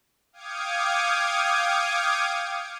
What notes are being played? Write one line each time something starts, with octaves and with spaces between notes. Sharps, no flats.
F5 G5 D6 D#6 G#6 C#7